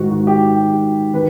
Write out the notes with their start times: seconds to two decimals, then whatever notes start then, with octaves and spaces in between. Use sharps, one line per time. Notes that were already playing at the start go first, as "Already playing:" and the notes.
Already playing: G#2 D#3 F#4
0.10 F#4
0.27 G4
1.13 D#3 B4